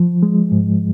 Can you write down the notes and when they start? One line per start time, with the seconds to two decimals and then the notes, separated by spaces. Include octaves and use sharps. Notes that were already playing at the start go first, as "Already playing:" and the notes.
Already playing: F3
0.23 G#3
0.52 G#2